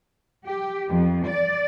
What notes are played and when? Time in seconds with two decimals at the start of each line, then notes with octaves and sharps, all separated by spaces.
0.47 G4
0.88 F2
1.26 D5